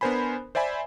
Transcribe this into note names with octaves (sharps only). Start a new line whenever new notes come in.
B3 D4 A#4 C5 G#5 B5
C5 D5 E5 G#5 B5